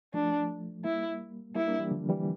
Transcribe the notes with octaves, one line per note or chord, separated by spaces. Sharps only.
F3 A3 D4
G3 A#3 E4
G3 A#3 E4
A#3 D4
E3 G3
D3 F3
E3 G3